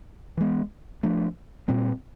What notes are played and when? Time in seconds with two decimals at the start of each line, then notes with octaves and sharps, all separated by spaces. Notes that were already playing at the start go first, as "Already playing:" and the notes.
0.37 E3 G#3 B3
1.03 F3 A3 D4
1.68 A#2 G3 C4